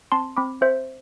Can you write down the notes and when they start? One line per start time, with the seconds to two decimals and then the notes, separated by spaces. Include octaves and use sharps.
0.12 C4 A5 C6
0.37 C4 B5 D6
0.61 C4 C5 E5